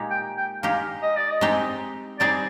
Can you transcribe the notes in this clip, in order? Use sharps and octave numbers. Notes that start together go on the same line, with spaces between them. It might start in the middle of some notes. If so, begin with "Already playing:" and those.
Already playing: A#2 G#3 D#4 G4
G5
G5
G#3 D#4 G4 F5
D#5
D5
D#5
G#3 C4 D#4 G4
G3 C4 D#4 G#4 D5